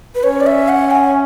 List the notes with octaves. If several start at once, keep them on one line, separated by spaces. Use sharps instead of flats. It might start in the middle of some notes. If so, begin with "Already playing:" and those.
B4
C#4 C#5
D5
E5
F#5
G#5